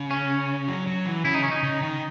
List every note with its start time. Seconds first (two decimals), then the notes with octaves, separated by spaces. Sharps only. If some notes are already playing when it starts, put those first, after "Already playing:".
Already playing: C#3
0.11 C#4
0.68 F#3
0.87 F#3
1.06 E3
1.25 C#3 E4
1.34 D#4
1.43 C#4
1.51 D#4
1.63 C#3
1.82 D#3